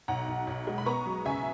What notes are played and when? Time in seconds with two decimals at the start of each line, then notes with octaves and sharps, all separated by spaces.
0.08 B1 F#5 A#5
0.28 B1
0.47 B1
0.67 G#3
0.78 B5
0.86 B3 A#5 C#6
1.06 F#3
1.25 C#3 E5 G#5